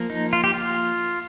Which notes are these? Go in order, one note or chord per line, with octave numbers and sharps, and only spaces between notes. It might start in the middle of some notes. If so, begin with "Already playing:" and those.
Already playing: F3 A#3
D#4
F4
G4
F4